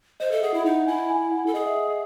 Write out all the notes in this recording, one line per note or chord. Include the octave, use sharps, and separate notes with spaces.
C5 D#5
A4 E5
G#4 F#5
E4 E5
D#4 F#5
E4 G#5
G#5
F#5
A4
G#4 D#5
E5
D#5
E5